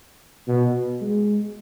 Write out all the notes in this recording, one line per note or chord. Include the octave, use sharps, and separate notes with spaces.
B2
G#3